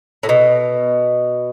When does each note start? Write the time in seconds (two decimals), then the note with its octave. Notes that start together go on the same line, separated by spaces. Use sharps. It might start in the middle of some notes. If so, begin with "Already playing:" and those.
0.23 A2
0.29 B2